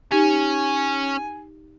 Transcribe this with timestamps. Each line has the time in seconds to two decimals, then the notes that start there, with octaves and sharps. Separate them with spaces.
0.12 C#4 D#4 G4 G#5